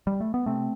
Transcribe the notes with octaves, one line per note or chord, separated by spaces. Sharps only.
G3
A3
B3
C3 A3 C4